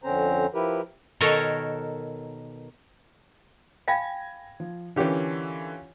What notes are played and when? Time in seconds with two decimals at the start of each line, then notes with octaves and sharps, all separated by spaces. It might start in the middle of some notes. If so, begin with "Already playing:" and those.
0.04 F2 D3 C4 C#4 C5 A#5
0.54 F3 E4 G4 A#4 B4
1.21 B2 D#3 A4 A#4 C#5 D#5
3.88 F5 G5 G#5 B5 G#6 A#6
4.60 F3
4.96 D3 E3 C#4 F4 G4 A#4 C#5